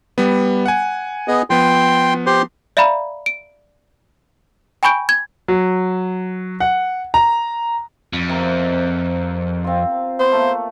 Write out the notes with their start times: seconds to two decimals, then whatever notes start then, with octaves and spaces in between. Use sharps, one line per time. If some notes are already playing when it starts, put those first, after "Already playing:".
0.18 G3 B3
0.66 F#5 G#5
1.28 B3 G#4 D#5
1.50 F3 B3 G5 C6
2.26 G4 C5 C6
2.77 D5 E5 F5 A#5 B5
3.26 D7
4.83 G5 G#5 B5 C#6 G6 D7
5.09 G#6
5.48 F#3
6.60 F#5
7.14 A#5
8.13 F2
8.29 C3 A#4
9.64 C4 F4
10.19 B3 C5
10.32 A3 A#3